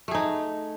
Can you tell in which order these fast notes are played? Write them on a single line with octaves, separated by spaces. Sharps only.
A3 G#4 D#4